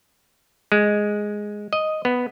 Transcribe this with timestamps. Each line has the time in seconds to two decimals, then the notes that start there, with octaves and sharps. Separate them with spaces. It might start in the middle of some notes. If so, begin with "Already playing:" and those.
0.72 G#3
1.73 D#5
2.05 B3